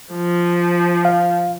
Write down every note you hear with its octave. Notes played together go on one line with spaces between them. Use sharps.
F3
F5